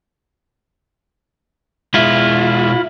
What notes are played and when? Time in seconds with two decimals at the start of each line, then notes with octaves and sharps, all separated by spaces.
1.94 B2 G#3 E4 F4